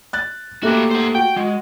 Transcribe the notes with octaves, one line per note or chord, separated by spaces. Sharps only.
F#6 A6
A3 A#3 E4 F#4 G4
C5 F#5
F#4 G5
G#3 F#4